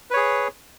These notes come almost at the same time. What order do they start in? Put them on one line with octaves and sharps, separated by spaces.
B4 C#5 G#4